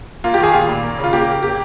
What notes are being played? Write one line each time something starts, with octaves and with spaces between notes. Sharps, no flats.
A#3 F4
G4
D#3
G#4
A#2 F4
A#2
A#3
C#3
F4
A#3 G4
C#3
A#3 G4